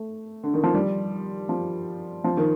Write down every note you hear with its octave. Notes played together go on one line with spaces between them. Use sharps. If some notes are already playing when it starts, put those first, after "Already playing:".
Already playing: A3
D3
D#3
F3
G3
F3
F3
D#3